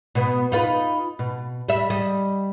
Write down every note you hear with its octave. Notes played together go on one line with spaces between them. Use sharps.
B2 B3
D#4 F4 B4
B2
G3 E5
G3 D#5